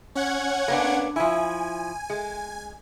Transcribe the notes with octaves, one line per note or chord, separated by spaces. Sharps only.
C#4 F#5 G#6
A#3 B3 D4
F3 E4 G#5
G#3